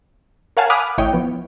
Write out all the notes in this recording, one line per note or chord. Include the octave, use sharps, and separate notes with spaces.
A#4 C#5 F5 F#5 G#5 A5
G#5 B5 D6 D#6 F6 F#6
A1 A2 E4 C#5 D#5 G5
F3 B3